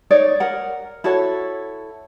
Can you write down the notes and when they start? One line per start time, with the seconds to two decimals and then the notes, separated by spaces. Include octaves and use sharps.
0.11 D#4 C#5 D5
0.40 A#4 F#5
1.04 E4 F#4 A4 C#5